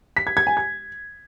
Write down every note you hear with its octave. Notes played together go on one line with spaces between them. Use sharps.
B6
G#6
G#6
G#5
G#6